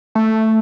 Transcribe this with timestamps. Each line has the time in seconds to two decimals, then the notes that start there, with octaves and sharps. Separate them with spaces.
0.15 A3